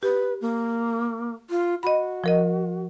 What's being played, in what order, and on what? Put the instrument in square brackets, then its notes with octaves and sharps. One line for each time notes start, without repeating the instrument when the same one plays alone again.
[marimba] G4 [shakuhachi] B4
[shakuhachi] A#3
F4
[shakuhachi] F#4 [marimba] D#5 B5
[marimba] F3 A#4 D#5